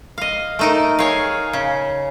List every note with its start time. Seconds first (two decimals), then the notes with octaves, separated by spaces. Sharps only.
0.18 D#5 F5
0.59 A3 D#4 A#4
0.99 G#4 C#5 F5
1.53 C#3